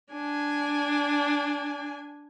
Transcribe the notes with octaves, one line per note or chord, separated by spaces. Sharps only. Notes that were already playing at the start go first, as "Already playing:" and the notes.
D4 G#5